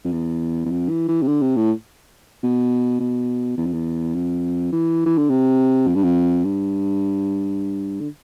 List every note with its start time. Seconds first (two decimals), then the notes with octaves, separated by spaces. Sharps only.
0.04 F2
0.13 E2
0.65 E2
0.71 F2
0.89 E3
1.08 E3
1.22 C3
1.27 D3
1.42 C3
1.56 A2
2.43 B2
3.00 B2
3.57 E2
3.65 F2
3.73 E2
4.14 F2
4.72 E3
5.06 E3
5.18 D3
5.29 C3
5.87 F2
5.95 G2
6.03 F2
6.44 G2
8.00 D3